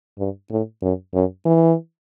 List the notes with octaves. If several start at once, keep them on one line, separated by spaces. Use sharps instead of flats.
G2
A2
F#2
F#2
E3